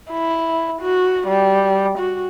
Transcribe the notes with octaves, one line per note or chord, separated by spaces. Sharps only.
E4
F#4
G3
F#4